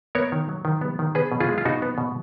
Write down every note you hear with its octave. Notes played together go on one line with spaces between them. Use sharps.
B3 A#4 C#5
D#3
F#3
D#3
B3
D#3
B3 G#4 B4
B2
F4 G#4
G#3
F4
B2 D#4 F#4
B3
B2